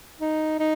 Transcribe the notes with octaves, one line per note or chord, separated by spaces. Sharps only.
D#4
D#4